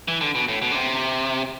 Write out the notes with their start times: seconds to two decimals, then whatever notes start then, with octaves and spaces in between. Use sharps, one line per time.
0.08 E3
0.21 D3
0.35 B2
0.48 A2
0.62 B2
0.71 D3
0.75 C3